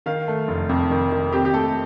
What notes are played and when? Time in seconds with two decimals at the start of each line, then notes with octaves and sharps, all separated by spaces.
0.06 D#3 F5
0.28 A3
0.48 F1
0.69 F2
0.90 D#3
1.11 D#3
1.33 C4 G4
1.45 G4
1.53 A3 A4